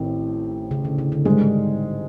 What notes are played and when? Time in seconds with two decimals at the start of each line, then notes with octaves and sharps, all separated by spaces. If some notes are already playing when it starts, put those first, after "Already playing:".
Already playing: A1 A2 D#3 C4
0.71 C#3
0.85 D3
0.98 C#3
1.12 D3
1.25 G#2 D#3 G3 G#3